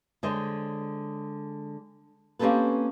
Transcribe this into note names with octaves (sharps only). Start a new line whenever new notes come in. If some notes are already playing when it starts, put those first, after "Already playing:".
D3 G#3 C5 C#5 D#5
A#3 C4 C#4 G4 A4 B4